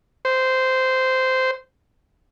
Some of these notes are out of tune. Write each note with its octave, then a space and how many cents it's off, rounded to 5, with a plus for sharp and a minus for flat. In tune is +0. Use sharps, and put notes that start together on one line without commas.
C5 -10